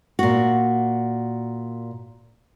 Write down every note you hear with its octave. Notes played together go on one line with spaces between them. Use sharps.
A#2 F#4